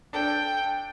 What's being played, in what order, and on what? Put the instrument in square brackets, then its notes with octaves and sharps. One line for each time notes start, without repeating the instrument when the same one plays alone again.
[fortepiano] D4 A4 [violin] G5